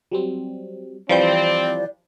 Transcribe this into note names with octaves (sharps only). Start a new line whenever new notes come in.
F#3 G3 C4
E3 F3 G3 C4 C5 D5 G6